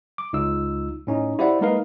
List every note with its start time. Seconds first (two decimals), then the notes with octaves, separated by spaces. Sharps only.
0.18 D6
0.33 C#2 D#4 F4 E6
1.07 A2 C#4 D#4
1.39 E4 G4 C5 D5 F5 F#5
1.61 G#3 A#3 D#4 A#4 B4 F5